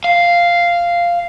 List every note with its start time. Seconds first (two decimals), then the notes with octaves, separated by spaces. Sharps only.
0.04 F5